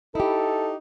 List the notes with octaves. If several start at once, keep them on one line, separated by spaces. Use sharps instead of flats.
D#4 E4 G4 A4